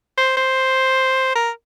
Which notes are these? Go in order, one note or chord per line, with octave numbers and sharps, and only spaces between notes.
C5
C5
A#4